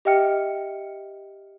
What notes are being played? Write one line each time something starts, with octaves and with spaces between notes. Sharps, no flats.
G4 D#5 E5 G5 F6 C#7